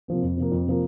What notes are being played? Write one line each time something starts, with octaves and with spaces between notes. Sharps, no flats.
C3 F3 A#3
F2
C3 F3 A#3
F2
C3 F3 A#3